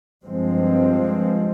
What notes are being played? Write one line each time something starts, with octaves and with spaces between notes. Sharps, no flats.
G2 F3 G#3 C4